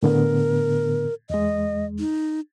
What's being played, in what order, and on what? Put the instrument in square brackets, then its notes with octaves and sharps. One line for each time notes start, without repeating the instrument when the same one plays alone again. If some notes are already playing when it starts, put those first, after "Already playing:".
[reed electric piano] A2 D3 B3 [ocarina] A#4
[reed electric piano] E2 G#3 [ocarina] D#5
[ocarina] D#4